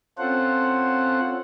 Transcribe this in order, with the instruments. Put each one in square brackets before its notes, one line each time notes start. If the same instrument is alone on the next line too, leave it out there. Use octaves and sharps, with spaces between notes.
[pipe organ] C4 C#4 F4 A4 C5 F#5